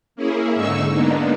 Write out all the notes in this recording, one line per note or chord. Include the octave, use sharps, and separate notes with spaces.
A#3 C#4 E4 G#4
G#2 D3 D#4 C#6 E6
G#3 A#3 B3 D4 D#4